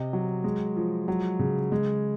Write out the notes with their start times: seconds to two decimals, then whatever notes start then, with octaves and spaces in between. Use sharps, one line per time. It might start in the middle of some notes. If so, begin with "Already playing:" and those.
Already playing: C3 D#5
0.13 F#3
0.44 G#3
0.77 F3
1.08 F#3
1.39 C#3
1.72 G#3